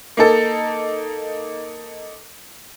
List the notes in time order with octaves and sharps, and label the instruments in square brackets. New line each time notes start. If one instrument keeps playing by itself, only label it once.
[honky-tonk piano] A#3 D#4 A4